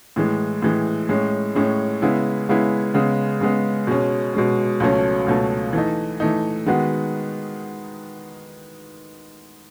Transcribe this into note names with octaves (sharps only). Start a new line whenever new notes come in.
A2 E3 G#3
A2 E3 G#3
A2 G#3 C#4
A2 G#3 C#4
C#3 G#3 B3 E4
C#3 G#3 B3 E4
C#3 G#3 B3
C#3 G#3 B3
B2 G#3 C#4
B2 G#3 C#4
C#2 B2 F#3 A3 C#4
C#2 B2 F#3 A3 C#4
E3 A3 D#4
E3 A3 D#4
D#3 G#3 B3 F#4